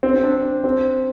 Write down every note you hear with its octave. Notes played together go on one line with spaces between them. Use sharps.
C4
C4
D4
C4